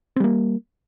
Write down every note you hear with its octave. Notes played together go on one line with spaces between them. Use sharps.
G3 A#3 C4